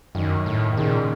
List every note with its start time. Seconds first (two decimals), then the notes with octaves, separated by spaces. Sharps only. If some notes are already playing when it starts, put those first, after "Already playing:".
0.15 F#2 D#3
0.46 A2
0.73 D#3
0.77 A#2 C#3